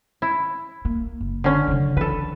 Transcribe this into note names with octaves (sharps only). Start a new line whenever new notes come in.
E4
A#3
F#1
D3 C#4
C#3 F#3
E3 A4 B4